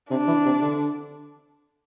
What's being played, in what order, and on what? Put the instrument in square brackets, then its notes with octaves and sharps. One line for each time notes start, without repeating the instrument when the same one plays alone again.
[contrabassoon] C3 [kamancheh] D4
[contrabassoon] E3
C3
D3